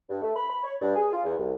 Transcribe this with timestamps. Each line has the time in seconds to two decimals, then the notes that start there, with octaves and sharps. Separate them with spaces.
0.09 G2
0.22 A3
0.36 B5
0.50 B5
0.63 C#5
0.81 G2
0.95 G#4
1.12 F4
1.24 E2
1.38 C2